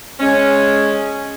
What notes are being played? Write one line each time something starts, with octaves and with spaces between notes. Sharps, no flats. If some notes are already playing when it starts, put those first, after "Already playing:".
G#3 C#4